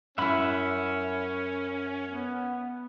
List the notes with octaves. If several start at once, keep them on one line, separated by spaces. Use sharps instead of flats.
F#2 C#4 E4 E5 F#5 B5
B3